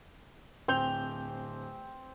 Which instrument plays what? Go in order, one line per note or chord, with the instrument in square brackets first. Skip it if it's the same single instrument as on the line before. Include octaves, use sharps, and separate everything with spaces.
[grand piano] D1 G6 F7 [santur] C4